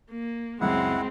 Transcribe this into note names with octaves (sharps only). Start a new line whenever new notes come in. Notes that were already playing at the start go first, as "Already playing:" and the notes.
A#3
C#2 F#2 G#3 C4 E4 F#5